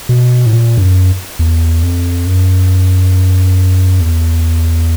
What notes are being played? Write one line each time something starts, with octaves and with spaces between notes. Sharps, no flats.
B2
A2
A#2
G2
F#2
E2
F2
F#2
E2